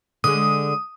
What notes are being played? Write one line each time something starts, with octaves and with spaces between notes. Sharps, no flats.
D3 G#3 D#6